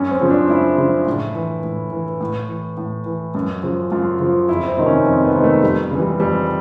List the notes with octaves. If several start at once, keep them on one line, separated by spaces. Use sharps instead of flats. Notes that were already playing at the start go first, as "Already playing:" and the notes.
Already playing: F#2 C#4
C4
C#3 F3
D4
F#2 E4
C#3 F3
A2
E3
A2
E3
A2
E3
A2
E3
F#2
C#3 F3
F#2 F4
C#3 F3
F2 E4
C4
C3 D#3
C#4
F2 C4
B3
C3 D#3
A3
F2 G3
C#3 E3
G3
F2 G3